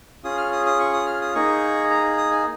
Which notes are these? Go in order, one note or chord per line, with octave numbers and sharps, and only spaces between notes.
C#4 F4 G#4 D#6
F6
D#6
D#6
C#6
D#6
F6
D#6
A#3 D#4 G#4 C#6
A#5
D#6
G#5